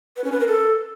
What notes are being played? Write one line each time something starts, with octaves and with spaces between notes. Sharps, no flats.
B4
C#4
B4
A#4
A4